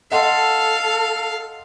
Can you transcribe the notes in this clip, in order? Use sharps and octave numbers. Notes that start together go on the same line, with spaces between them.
A4 D#5 F5 F#5 C6